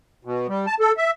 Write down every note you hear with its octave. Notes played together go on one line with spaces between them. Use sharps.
B2
G3
A5
A4
E5